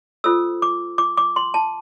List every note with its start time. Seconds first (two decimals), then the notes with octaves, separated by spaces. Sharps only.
0.24 F4 A4 C5 E6
0.62 D6
0.98 D6
1.17 D6
1.36 C6
1.54 A5